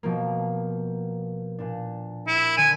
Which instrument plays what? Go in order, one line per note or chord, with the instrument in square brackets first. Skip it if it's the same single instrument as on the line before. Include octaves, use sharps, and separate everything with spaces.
[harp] B2 F3 A#3
A#2 D4
[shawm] E4
[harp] D3 [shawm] G#5